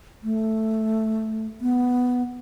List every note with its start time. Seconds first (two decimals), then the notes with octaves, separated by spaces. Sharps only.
0.23 A3
1.61 B3